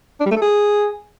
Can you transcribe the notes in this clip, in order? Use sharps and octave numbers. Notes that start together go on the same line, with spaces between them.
D4
G3
A3
A4
G#4